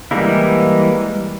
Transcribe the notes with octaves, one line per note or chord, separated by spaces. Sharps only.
E3 G3 G#3 A#3 E4